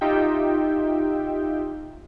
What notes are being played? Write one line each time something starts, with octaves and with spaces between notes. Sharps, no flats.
D#4 F4 G4 E5 G5